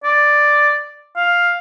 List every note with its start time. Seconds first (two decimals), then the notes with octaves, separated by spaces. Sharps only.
0.04 D5
1.16 F5